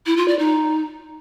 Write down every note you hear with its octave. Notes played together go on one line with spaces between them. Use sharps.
E4
F4
D5
D#4